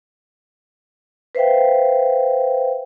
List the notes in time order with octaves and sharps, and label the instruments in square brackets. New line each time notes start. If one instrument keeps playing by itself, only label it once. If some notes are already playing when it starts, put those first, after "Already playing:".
[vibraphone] B4 C5 E5 F5 G5